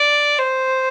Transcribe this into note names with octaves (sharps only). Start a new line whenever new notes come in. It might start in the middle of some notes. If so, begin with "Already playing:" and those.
Already playing: D5
C5